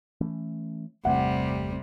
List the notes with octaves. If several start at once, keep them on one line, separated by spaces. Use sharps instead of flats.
E3 A3 C#4
G1 E2 C3 G3 A3 F#5